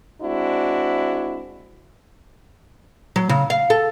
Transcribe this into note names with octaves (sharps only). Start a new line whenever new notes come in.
G#3 C4 D4 E4 F#4
F#3
C#3
F5
A4